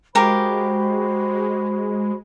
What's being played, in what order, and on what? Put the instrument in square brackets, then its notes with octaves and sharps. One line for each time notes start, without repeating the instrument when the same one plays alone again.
[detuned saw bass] G#3 [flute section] F#4 C5 B5 [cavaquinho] G4 A#4 F5